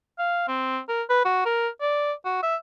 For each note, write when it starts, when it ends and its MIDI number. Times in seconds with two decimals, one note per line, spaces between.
0.18 0.45 77
0.48 0.79 60
0.89 1.02 70
1.10 1.21 71
1.25 1.44 66
1.45 1.68 70
1.81 2.12 74
2.25 2.42 66
2.43 2.56 76